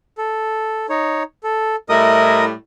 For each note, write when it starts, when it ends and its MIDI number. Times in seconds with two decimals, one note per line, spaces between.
0.18 0.86 69
0.89 1.23 63
0.89 1.23 73
1.44 1.76 69
1.89 2.52 45
1.89 2.52 55
1.89 2.52 64
1.89 2.45 70
1.89 2.45 75
1.89 2.45 87